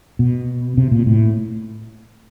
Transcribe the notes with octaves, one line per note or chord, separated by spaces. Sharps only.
B2
C3
A#2
A2